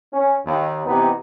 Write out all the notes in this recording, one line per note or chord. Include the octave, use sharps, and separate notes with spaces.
C#4
D#2
C3 E3 B3 D#4 G4 B4